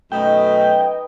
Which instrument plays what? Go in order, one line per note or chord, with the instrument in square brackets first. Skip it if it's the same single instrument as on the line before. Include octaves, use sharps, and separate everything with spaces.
[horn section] F#2 B2 A3 [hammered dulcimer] D#4 B4 D6 [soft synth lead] D#5 [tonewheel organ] G5